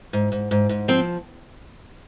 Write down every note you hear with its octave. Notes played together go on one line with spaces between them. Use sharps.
G#2
G#2
G#2
G#2
F3 C4